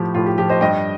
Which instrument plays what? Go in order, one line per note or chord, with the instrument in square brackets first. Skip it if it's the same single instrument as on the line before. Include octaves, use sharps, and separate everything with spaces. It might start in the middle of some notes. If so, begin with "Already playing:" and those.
Already playing: [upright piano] A2 F3 G4
A2 F4
G4
F3 G4
C5 D#5
G2 D#5 G5